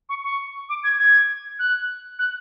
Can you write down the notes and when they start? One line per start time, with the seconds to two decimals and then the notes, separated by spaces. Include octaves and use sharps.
0.09 C#6
0.24 C#6
0.69 D6
0.84 G#6
0.99 G#6
1.59 F#6
2.19 F#6